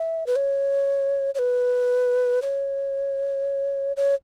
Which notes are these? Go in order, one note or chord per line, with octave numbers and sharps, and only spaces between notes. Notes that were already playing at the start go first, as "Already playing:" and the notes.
Already playing: E5
B4
C#5
C#5
B4
C#5
C#5